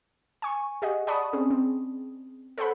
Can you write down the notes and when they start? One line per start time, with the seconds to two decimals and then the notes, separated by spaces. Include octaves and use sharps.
0.42 G#5 C#6
0.82 G4 G#4 D#5 F#5
1.07 D5 F#5 A5 B5 C#6 D#6
1.33 C4 C#4 G#4
1.50 C4
2.58 A4 C5 C#5 F#5 B5